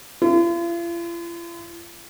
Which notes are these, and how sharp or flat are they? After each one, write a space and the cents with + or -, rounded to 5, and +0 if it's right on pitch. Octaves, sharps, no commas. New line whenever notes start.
F4 -45